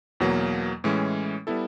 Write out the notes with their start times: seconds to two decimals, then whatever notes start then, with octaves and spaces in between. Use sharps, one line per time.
0.20 E2 B2 F#3 A#3
0.84 A2 E3 G#3 C#4
1.47 G3 B3 E4 A4